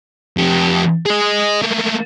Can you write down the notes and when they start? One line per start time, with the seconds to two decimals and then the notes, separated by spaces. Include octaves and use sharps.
0.37 F2 G4
1.06 G#4 D#5
1.62 A3 A#3